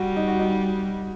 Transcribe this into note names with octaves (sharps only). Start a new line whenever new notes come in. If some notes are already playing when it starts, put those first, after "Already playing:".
Already playing: G3 F#4
D#4
F#4
D#4